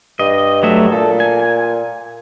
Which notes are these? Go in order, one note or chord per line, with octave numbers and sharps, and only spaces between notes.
G2 D#5
F#3 A3 E5
A#2 A4
G#5